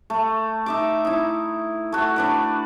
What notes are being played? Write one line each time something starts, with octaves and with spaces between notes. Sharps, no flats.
A3
D#4 E5 D6
D#4 E4
A3 F#4
D4 B4 D5